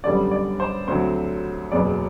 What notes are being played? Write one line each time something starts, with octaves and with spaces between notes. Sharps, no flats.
F#2 D3 G3 B3 D5
D5
C5
D2 D3 F#3 C4 C5
F#1 E2 B2 F#3 B3 D5